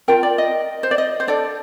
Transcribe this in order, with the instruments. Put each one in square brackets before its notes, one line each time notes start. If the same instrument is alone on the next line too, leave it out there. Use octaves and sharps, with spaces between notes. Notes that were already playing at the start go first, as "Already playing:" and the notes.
[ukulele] F4 A#4 G5
D5
D#5
C5
D5
D#5
C5
D4 A4 D5